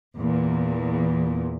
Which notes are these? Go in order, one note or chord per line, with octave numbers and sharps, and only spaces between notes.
E2 A#2